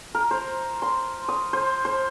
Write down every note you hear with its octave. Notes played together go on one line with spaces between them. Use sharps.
A#4
C5
C6
D#6
C5
C5